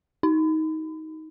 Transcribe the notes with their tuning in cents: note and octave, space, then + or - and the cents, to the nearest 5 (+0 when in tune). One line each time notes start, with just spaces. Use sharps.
D#4 +20